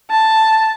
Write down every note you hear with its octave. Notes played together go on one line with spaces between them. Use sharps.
A5